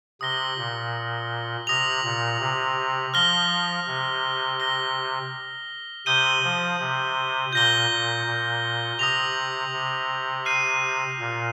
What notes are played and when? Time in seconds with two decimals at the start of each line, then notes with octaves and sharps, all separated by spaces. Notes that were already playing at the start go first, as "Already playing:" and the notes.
0.21 C3 D#6 A#6 G7
0.57 A#2
1.67 C3 D#6 A#6 F7
2.04 A#2
2.40 C3
3.14 F3 F6 A#6 G7
3.87 C3
4.60 A#6 G7
6.06 C3 D#6 G6 D#7 G7
6.43 F3
6.80 C3
7.53 A#2 G6 A#6 G7
7.90 A#2
8.26 A#2
8.99 C3 D#6 A#6 F7
9.72 C3
10.45 F6 C7 D#7
11.19 A#2